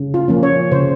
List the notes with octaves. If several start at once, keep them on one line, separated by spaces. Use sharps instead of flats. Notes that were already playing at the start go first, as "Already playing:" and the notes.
Already playing: C#3
F4
F3 A#3 C#4
C#5
C#3 C5